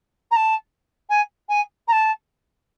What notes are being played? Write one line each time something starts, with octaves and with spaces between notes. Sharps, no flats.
A#5
A5
G#5
G#5
A#5
A5